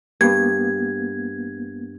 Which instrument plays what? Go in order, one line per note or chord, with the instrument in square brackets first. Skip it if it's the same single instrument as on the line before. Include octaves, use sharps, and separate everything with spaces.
[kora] G2 [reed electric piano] A#3 B3 [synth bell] G#6